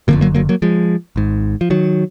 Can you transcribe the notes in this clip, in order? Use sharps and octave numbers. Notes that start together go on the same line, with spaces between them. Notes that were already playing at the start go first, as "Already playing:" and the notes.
F#1 F2 D3 F#3 A#3
F#3 A#3
F#3 A#3
F#3 A#3
F3 G#3
G#1 G#2
F3
D#3 F#3